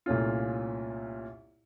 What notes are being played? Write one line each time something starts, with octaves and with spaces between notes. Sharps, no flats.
C2 A#2 A3 C#4 F4